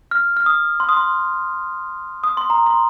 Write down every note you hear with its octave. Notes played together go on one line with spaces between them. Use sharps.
F6
F6
D#6
C6
D#6
C6
D#6
C6
A#5
C6